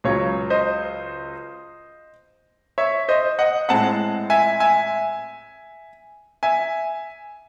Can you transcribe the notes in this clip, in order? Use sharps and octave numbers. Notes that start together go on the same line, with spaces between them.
C#2 C#3 F#3 C#5
C5 D#5
C#5 E5
C5 D#5
D#5 F#5
A2 G#3 C4 F#5 A5
E5 G#5
E5 G#5
E5 G#5